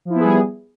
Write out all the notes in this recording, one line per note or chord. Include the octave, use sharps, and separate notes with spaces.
F3 G3 B3 E4 G#4